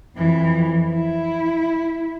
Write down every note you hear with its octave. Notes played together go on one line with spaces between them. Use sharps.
F2 E3
E4